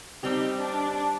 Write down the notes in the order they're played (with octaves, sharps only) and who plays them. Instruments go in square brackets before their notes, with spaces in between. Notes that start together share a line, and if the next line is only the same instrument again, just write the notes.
[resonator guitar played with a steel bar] G3 C4 G4 [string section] D#4
[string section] D4